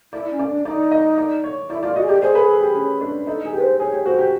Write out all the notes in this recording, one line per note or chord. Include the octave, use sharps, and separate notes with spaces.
E4 D5
C#4
D5
D4
D#4 D5
D#5
D5
C#5
E4 D5
F4 D5
F#4 D#5
G#4
G4 D5
G#4 C5
B4
A4
G4
C#4
D4
D#4 A4
G#4
G4 B4
C5
G#4 C#5
G4
F#4 C5
G4